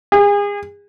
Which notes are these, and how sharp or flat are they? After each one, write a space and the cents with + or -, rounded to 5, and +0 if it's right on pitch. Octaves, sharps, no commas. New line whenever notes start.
G#4 -35